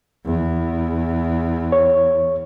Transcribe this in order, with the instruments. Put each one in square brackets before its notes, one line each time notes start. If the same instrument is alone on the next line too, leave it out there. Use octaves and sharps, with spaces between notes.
[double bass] E2
[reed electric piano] C#5